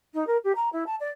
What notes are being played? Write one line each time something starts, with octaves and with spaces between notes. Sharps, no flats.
D#4
A#4
G4
A#5
E4
A5
D5